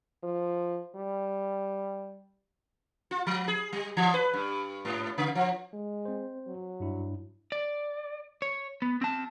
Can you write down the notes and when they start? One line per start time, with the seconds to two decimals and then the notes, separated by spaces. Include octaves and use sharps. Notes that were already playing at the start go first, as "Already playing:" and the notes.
0.23 F3
0.96 G3
3.11 F4
3.27 F3
3.48 G#4
3.73 G3
3.97 E3
4.14 B4
4.33 G2
4.85 G#2
5.18 C#3
5.35 F3
5.73 G#3
6.05 C4 C5
6.47 F#3
6.80 G2 D4 E4
7.52 D5
8.42 C#5
8.82 B3
9.02 C4 A5